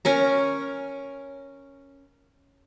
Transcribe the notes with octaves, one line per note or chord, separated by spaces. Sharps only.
C#4 A#4 A#5